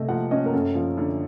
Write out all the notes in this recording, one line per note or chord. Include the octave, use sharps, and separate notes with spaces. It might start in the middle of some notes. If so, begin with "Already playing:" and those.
Already playing: C3 A3 D#5
F3 F#5
C#4 D#5
A#4
F#2 A4
F3
D3